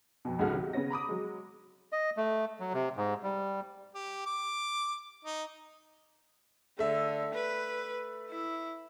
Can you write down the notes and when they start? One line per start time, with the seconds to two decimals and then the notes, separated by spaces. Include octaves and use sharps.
0.25 F2 B2
0.39 C#2 G#2 C#3 F#4 A4 F6
0.53 C3 D#3 F#3
0.73 C#3 B3 C#4 A#6
0.90 A#5 B5 D6 D#6
1.09 F#3 G#3
1.92 D#5
2.17 A3
2.60 F#3
2.73 C3
2.96 G#2
3.23 G3
3.95 G4
4.26 D6
5.25 D#4
6.79 D3 A3 E5
7.34 B4
8.30 E4